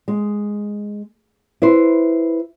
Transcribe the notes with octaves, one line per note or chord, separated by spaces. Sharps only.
G#3
E4 B4 C5